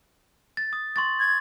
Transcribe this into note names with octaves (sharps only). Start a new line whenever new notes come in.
A6
D#6
C6 C#6 A6
G#6